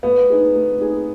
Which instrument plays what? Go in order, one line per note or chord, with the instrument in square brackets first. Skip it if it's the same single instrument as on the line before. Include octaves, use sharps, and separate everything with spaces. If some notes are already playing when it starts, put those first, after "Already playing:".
[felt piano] A3 [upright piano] B3
[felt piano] D#4 G#4
A3
D#4 G#4